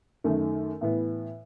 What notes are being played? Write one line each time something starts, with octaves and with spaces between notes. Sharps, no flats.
F#2 D#3 A3
A2 E3 B3